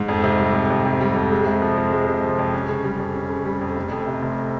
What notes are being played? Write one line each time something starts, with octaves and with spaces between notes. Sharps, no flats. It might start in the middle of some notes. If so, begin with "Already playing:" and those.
Already playing: G#2
F2
C3
G3
F2
F2
C3
G3
F2
G#3
C3
F3
F2
G#3
C3
F3
F2
C#4
C#3
G3
F2
C#4
C#3
G3
F2
F1
F2
C3
F1